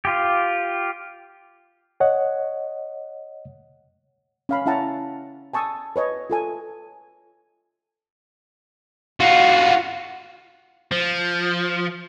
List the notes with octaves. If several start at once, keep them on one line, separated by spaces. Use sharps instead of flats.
F4 G4
C#5 D#5 F#5
C#4 F5 B5
C#4 E4 E5 F#5 A5 A#5
G#5 A5 C#6 D#6 E6
B4 C#5 D#5
F4 A4 G#5
F4 F#4
F3